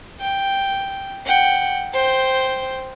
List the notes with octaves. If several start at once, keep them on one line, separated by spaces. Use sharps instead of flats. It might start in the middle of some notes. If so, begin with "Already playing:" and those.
G5
F#5 G5
C5 G5